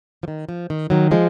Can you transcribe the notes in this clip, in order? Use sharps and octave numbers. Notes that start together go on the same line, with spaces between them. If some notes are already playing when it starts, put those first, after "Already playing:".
F3
D#3
F3
D#3
D#3 F#3
F3 G#3